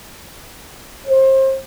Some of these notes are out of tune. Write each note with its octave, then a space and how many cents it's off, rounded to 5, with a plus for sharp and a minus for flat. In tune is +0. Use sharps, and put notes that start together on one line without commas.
C5 +30